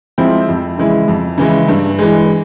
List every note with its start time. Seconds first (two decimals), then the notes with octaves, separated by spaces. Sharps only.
0.18 F3 G#3 C4 E4
0.48 F2
0.78 C#3 E3 G#3 E4
1.08 F2
1.38 C#3 E3 G#3 E4
1.69 G2
1.99 E3 G#3